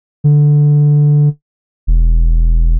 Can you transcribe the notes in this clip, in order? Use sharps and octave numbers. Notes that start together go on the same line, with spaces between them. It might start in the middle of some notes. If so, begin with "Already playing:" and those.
D3
E1